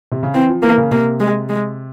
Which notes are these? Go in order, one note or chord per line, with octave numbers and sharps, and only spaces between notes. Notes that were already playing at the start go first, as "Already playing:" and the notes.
C3
C#3
E3 C4
F3
E3 A#3
C#3
C3 A#3
G#3
G#3